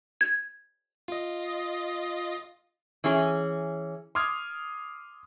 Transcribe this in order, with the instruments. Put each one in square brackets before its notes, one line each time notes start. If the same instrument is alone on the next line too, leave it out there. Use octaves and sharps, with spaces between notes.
[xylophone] G#6
[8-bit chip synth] F4 D#5
[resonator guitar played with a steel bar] E3 C#4 G#4
[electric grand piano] C6 D6 D#6 F6 G#6